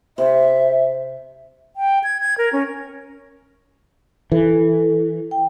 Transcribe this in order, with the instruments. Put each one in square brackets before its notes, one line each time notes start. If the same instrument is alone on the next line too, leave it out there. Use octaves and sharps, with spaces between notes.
[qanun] C3 [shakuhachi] E5
[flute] G5
G#6
G#6
A#4
C#4
[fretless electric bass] E3 [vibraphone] A4
[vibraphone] G5